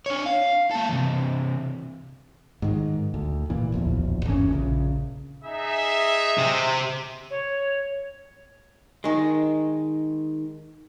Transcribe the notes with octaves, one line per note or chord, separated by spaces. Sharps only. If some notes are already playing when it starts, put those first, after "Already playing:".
D4 C#5
F5
A#3 A4
C3 E3
G#2 D#3
D2
A#2 E3
D1 A#1 E2
G1 E2 C#4
A#1 C#3
D#4 G#4 E5
C3
C#5
D#3 G#3